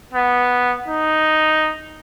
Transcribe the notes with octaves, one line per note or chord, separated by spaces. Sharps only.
B3
D#4